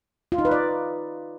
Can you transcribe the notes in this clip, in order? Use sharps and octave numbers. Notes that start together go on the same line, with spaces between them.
F4
D#4
B4
D5